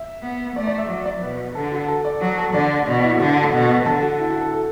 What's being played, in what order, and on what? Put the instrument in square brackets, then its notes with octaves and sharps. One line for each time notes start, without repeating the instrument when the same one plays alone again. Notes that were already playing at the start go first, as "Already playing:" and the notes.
Already playing: [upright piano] E5
[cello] B3
[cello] A3 [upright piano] D5
[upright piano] D5
E5
[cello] F#3 [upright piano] D5
[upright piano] D5
[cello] B2 [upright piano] B4
[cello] D3 [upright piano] A4
[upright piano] F#4
A4
D5
[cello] F#3 [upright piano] F#4
[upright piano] A4
[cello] D3 [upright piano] D5
[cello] B2 [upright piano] D4
[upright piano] E4
[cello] D3 [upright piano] F#4
[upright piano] A4
[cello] B2
[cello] D3 [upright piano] A4
[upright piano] F#4
E4
F#4
A4
A4